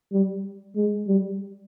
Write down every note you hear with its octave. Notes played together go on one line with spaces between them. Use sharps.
G3
G#3
G3